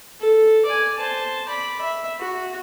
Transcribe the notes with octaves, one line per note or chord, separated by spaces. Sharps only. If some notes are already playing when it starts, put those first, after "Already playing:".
A4
D5 G#5
C5 A5
D5 B5
E5
F#4